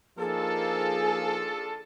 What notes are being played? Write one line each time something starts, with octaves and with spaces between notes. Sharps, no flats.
F3 A#3 D4 D#4 F4 G#4 A4